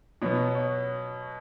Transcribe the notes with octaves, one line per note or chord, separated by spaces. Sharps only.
B2 F#3 B3 C#5
C#5